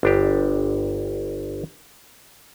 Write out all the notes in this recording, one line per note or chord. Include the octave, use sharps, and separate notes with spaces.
G1 D4 G4